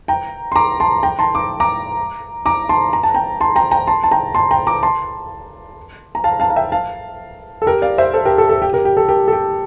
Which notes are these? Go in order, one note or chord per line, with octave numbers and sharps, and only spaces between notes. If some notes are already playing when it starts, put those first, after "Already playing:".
G5 A#5
C6
A#5 D6
A5 C6
G5 A#5
A5 C6
D6
A#5 D6
A#5 D6
A5 C6
A#5
A5
G5 A#5
A5 C6
G5 A#5
G5 A#5
A5 C6
A5
G5 A#5
A5 C6
G5 A#5
A#5 D6
A5 C6
A#5
F5 A5
F5 A5
F5
E5 G5
F5 A5
A4
G4 A#4
D5 F5
C5 E5
A4 C5
G4 A#4
A4
A4
G4
G4 A#4
G4
A4
G4 A#4
A4
G4